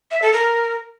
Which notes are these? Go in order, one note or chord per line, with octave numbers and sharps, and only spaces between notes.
E5
A4
A#4